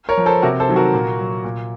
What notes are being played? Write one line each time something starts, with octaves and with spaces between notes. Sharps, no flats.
A#4 C#5
F3
A4 C5
C3 F#4 A#4
A4 C5
D#3 F#3
F#4 A#4
A#2
F#3
A#2